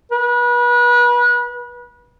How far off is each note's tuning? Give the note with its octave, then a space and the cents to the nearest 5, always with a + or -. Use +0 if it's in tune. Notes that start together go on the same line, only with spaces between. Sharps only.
B4 -35